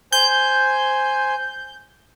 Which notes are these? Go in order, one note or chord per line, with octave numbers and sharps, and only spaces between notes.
C5 G#5 G6